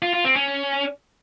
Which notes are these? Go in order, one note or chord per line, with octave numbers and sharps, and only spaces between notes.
F4
F4
C4
C#4